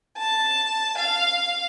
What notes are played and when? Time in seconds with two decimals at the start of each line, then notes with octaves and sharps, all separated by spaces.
0.19 A5
0.99 F5